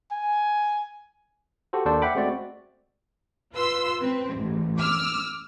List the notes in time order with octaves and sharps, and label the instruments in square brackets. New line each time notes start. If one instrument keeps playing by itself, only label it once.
[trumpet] G#5
[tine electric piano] F#4 G4 A4 C5
D#2 A#3 D4 A4 C5 D5
E5 F#5 G5 B5 D6
G#3 A3 C4 F#4 D5
[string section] F4 B4 C6 E6
C4 B4
A1 G#2
D6 E6 F6